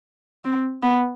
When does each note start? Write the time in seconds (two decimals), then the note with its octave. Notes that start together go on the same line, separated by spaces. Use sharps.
0.45 C4
0.83 B3